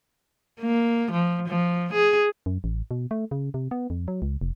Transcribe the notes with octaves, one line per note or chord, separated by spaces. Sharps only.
A#3
F3
F3
G#4
F#2
A1
B2
A3
C#3
C3
B3
F2
F#3
C#2
F1